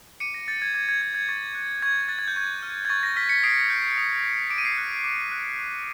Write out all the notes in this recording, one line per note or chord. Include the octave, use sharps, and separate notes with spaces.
D6 C#7 D#7
A#6
G6 A6
G#6
D6 G#6
G#6
G6 G#6
G#6
C#6 A6
F#6
C#6 G#6
F#6 A6
G#6
G6
C#6 G#6
F6
G#6
C#6 A6
A#6
F6 B6
B6 C#7
D#6 C7 D7
G6
D#6
G6
D6 D7
D#7
C7 D7
F#6
D6
F#6
C#6